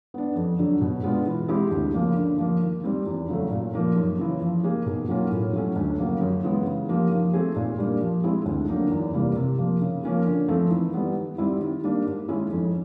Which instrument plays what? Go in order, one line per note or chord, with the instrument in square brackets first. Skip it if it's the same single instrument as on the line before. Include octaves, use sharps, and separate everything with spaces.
[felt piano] B3 D4
F2
D3 F#3
B2
G#3 B3 D4 F4
E3
G#3 C4 E4 G4
D2
C#3 F3 A#3
D3
F3 A#3
D#3
G3 C4
E2
C#3 F#3 A3
A#2
F3 A#3 D#4
F#2
C#3 E3
F3
A#3 D#4 G#4
B2
F#3 A#3 C#4 F4
A2
F#3 A3 C#4
D2
C#3 F#3 A#3
F#2
C#3 E3 G#3 B3
C#3
F3 A#3 D#4 G4
F3
A3 C4 D#4 G#4
A#2
G3 A#3 D4
F3
G#3 C4 E4 G#4
D2
D3 F#3 A#3 D#4
E2
C3 E3 G3 A#3
C3
F3 A#3
C#3
F3 A#3 C#4 F4
D3
F3 A3 C4 D#4
E3
G3 B3
D#3
G3 C4 E4
D#3
G3 A#3 D4
G#2
D#3 G#3 C#4 E4
F2